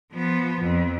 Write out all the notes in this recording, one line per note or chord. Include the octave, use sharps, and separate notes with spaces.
F3 B3
F2